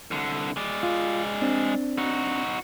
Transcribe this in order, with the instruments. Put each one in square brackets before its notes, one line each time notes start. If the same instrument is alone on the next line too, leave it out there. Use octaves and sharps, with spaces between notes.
[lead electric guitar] C2 D3
G#3 D5
[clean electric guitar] F4
C4 D4
[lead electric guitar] D#4 F#4